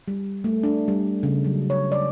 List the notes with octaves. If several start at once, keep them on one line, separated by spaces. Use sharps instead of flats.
G3
A3
D4
G3
C#3
F#3
C#5
D5